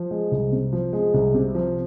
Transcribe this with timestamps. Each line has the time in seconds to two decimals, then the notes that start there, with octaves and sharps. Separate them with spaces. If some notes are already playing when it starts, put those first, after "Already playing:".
Already playing: F3
0.11 G#3
0.31 C2
0.52 C3
0.73 F3
0.93 G#3
1.14 C2
1.34 C3
1.54 F3